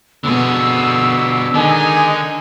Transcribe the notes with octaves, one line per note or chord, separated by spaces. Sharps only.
B2 D3 G#4 E6
D3 D#3 G#3 D#4 G#5